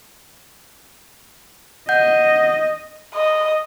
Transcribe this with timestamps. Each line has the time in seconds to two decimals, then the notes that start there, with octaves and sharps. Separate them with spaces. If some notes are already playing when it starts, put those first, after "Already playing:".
1.89 D#5 F#5 G6
3.15 D#5